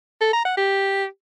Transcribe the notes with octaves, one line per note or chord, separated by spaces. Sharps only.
A4
A#5
F#5
G4